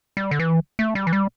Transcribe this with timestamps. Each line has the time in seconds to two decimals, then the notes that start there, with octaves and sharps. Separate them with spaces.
0.17 G3
0.31 D3
0.39 E3
0.79 A3
0.95 G3
1.07 E3
1.13 G3